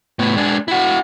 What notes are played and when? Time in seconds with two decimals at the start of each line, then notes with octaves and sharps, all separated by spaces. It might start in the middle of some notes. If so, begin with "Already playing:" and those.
0.19 A2 B3
0.36 G#3 D4
0.68 E4 F#4